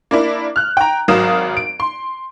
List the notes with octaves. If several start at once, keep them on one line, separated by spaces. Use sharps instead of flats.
A#3 D4 E4
F6 F#6
G5 A#5
G#1 F#3 A#4 F5 D#6 E7
D7
C6